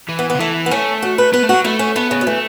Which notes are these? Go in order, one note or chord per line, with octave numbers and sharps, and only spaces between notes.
E3
B3
B3
C#3
E3 A3
B3
A3 C#4
F#4
B4
B3 B4
A3
F#3 F#4
A3 E4
C#4
A3 B3
C#3
F#3
E3 A3